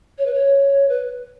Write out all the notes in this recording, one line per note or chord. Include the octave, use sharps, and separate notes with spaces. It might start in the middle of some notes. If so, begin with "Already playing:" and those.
C#5
B4
C#5
B4